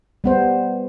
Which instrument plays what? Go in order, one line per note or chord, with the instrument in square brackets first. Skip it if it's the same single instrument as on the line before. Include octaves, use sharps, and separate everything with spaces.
[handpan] G3 B3 C5